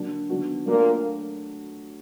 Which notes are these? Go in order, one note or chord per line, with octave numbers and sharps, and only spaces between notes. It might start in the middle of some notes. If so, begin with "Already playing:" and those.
Already playing: D3 F#3 A#3 D4
D#3 F#3 B3 D4 F#4
A#2 F#3 A3 A#3 D4